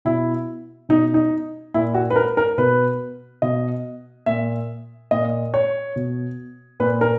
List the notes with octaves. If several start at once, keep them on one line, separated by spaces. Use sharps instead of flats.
B2 E4
B2 D#4
D#4
A#2 E4
F#4
B4
A#4
A#4
B2 B4
B2 D#5
A#2 E5
A#2 D#5
C#5
B2
A#2 B4
A#4